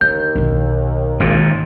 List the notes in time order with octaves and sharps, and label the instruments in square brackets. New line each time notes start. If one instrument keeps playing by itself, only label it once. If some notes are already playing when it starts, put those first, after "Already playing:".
[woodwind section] D#2 [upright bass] D3 [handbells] G6
[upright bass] B1 D#3
[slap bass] G#1 A#2